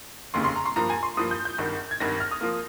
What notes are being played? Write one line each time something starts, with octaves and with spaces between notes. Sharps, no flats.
F1 D#2 C#3 C6
C6
A#5
C6
G2 F3 A#3 A#5
G#5
C6
G2 F3 A#3 D#6
G6
G6
G#1 G2 D#3
G#6
G#1 G2 D#3 A#6
F6
D#6
F3 A#3